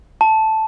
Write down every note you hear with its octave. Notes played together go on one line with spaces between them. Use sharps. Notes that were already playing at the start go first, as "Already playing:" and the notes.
A5